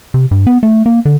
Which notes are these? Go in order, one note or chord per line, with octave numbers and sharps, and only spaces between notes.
C3
G2
B3
A3
A#3
D3